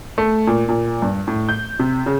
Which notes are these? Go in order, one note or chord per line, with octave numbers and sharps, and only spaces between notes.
A3
A#2
A#2
G2
A2
G6
C3
C#3